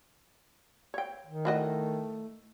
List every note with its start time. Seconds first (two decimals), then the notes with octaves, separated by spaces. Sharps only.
0.94 C#5 G5
1.27 D#3
1.45 E3 A3 F#4 D#5